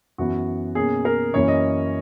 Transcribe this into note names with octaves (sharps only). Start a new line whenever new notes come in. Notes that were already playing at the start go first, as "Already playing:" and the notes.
F#2 E3 B3 F#4
B2 A#3 C#4 G#4
A#4
F#2 E3 A#3 C#4 C#5
D#5